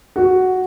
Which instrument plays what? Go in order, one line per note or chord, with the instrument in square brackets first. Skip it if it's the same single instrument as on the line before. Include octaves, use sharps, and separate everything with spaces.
[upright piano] F#4